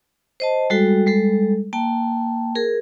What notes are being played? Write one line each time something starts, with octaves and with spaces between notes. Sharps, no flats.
C5 D#5 A5
G3 G#3 F#4 A4 G5
G3 G#3 A4
A#3 G5 A5
G#4 A#4